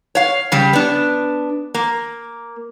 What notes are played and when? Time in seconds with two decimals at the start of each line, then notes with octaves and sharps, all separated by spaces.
0.15 C#5 F5
0.52 C#3 G3 G4
0.73 B3 D4
1.74 A#3